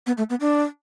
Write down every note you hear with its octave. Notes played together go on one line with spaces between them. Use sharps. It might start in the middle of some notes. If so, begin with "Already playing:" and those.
B3
A3
B3
D4